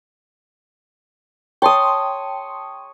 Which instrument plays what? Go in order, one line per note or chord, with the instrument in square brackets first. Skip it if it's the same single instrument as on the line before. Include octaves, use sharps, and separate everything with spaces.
[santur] C#5 D#6 [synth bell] G5 A5 C6